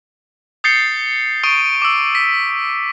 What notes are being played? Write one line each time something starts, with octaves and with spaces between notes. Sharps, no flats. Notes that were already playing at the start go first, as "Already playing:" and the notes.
D#6 G6 A6 C7 C#7 G7
C#6 D#6 D7 D#7 G7
D6 E6
B6